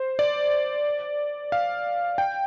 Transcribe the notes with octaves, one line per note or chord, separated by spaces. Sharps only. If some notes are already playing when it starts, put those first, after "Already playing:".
Already playing: C5
D5
F5
G5